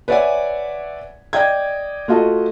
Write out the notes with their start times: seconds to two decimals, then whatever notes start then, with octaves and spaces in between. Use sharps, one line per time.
0.08 B4 C#5 D5 E5 F#5 G#5
1.33 D5 D#5 G5 G#6
2.08 A3 F4 F#4 D#5 A5